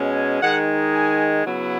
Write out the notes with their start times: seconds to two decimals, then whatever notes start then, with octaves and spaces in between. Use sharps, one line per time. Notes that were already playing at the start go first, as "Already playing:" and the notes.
Already playing: B2 G#3 C#4
0.42 D#3 G#3 D#4 F#5
0.94 G#5
1.46 C#3 F#3 B3 E4